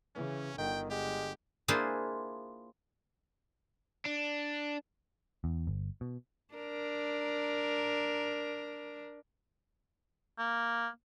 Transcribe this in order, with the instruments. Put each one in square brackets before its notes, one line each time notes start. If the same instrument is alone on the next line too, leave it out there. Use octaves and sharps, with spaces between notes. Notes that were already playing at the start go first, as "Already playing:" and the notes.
[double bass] C#3 E3 [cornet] C#4
[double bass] G1 D3 [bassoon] D#3 [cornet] G5
[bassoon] G#3 [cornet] G4
[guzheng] A#3 D4 E4 F4 G#4 C5
[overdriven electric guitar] D4
[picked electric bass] E2
G1
B2
[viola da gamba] D4 A#4
[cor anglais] A#3